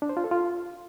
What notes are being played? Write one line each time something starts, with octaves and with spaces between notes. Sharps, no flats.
D4
C5
F4
A4
F4